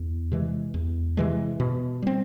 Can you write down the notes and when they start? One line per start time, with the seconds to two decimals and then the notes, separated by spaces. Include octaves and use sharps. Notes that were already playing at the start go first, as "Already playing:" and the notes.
Already playing: E2
0.32 C3 E3 G#3
0.74 E2
1.17 C3 E3 G#3
1.60 B2
2.02 G3 C4